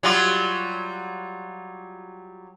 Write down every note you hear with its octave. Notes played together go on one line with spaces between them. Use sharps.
F#3 G3 F4